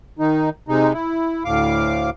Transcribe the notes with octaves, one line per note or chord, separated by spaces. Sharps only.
D#3 D#4
C3 G#3 D#4
E4
D2 A2 F5 D6